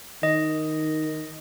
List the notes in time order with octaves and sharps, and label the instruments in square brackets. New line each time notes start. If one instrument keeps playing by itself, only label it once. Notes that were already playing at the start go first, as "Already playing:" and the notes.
[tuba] D#3 [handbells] D#5